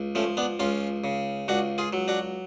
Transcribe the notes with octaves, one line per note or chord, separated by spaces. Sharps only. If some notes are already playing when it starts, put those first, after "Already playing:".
Already playing: C#2
F3 A3 C#4
B3 D4
C#2 C#4 F4
C#3
C#2 D4 F#4
F4 G#4
F#3
D4 F#4